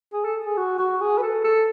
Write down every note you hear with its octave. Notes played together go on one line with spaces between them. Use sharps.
G#4
A4
G#4
F#4
F#4
G#4
B4
A4
A4